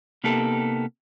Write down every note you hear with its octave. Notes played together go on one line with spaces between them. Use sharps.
C3 A#3 B3 D#4 G4 A4